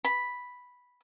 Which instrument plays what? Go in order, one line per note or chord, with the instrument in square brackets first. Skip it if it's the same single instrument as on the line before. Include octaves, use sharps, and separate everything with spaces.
[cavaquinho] B5